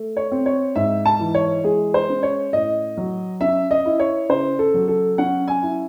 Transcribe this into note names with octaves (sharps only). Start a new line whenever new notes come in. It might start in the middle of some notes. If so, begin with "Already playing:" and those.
Already playing: A3
C#5
C4
C#5
G#2 E5
A5
E3
C#5
G#3 G#4
C5
C#4
C#5
A2 D#5
F#3
C#4 E5
D#5
E4
C#5
C#3 C5
A4
F#3
A4
C#4 F#5
G#5
E4